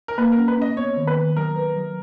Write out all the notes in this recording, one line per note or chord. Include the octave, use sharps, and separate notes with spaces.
A#4
A#3 B4
A#4
C#4
B4
C#4 D#5
B3 C#5
D#3
B4
D#3
F#3 A#4
B4
F#3